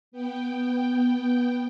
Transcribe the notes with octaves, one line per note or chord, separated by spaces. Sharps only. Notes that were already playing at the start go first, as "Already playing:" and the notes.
B3 G5